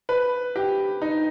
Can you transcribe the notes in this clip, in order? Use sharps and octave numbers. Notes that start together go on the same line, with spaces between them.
B4
G4
D#4